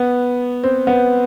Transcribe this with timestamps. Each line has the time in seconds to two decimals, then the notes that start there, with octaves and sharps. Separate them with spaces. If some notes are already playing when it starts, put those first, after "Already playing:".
Already playing: B3
0.64 C4
0.87 B3